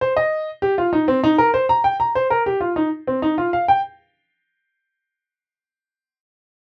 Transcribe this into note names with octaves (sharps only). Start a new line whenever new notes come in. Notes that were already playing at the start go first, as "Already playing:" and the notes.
C5
D#5
G4
F4
D#4
C4
D#4
A#4
C5
A#5
G5
A#5
C5
A#4
G4
F4
D#4
C4
D#4
F4
F5
G5